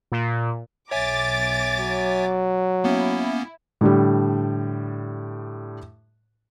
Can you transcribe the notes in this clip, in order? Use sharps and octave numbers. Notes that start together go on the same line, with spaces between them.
A#2
B1 C#5 E5 G#5 D6 A6
F#3
A#3 B3 C#4 E4
A2 D3 G3